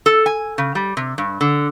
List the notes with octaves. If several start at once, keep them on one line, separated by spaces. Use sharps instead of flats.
A4
G#5
C#3
G3
C3
G2
D3